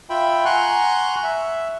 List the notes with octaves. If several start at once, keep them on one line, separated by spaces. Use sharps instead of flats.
F4 E5 G5 B5
F#5 G#5 A#5 C6 C#6 F#6
E5